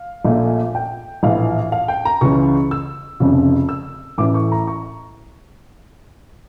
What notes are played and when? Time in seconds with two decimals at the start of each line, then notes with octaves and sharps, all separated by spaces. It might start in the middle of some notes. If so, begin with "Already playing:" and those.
Already playing: F5
0.25 A#1 A#2 A3
0.75 G5
1.23 A#1 A2 E3 F5
1.72 F5
1.88 G5
2.05 A#5
2.21 C#2 C#3 E3 C#6
2.71 E6
3.20 F1 F2 C#3
3.69 E6
4.18 A1 A2 E3 A3 D6
4.34 C#6
4.52 A#5
4.67 C#6